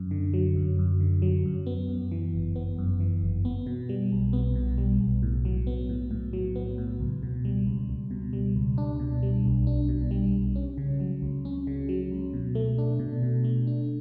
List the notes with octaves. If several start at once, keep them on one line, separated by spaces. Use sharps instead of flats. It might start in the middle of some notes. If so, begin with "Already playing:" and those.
Already playing: F#2
D3
F#3
F#2
F#2
D3
F#3
F#2
B3
F#2
E3
G1
B3
F#2
E3
G1
B3
B2
G3
B1
B3
B2
G3
B1
A2
F#3
B3
A2
A2
F#3
B3
A2
C#2
B2
G3
C#2
C#2
B2
G3
C#2
D4
B2
G3
B1
D4
B2
G3
B1
C#4
C#3
F#3
C#2
C#4
C#3
F#3
C#2
B2
A3
D4
B2
B2
A3
D4